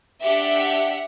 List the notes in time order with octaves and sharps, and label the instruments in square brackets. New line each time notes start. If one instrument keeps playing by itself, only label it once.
[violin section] D4 G4 E5 F#5